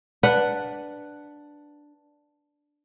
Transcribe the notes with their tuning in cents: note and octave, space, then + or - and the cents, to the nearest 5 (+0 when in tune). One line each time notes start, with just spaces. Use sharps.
D4 +0 B4 +0 F#5 +0